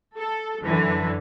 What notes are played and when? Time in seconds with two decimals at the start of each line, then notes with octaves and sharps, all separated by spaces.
0.17 A4
0.62 F#2 D3 E3